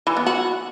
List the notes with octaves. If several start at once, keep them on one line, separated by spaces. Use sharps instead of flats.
E3
B3
F#4